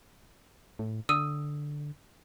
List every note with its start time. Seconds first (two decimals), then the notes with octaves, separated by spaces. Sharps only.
0.79 A2
1.09 D3 D#6 E6 D#7